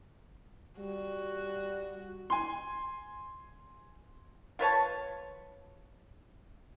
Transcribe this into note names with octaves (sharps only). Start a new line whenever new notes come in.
G3 F#4
G#5 C6
F4 B4 C#5 A5